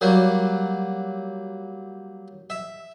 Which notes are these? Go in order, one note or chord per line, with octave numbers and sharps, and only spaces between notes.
F#3 G3 A#3
E5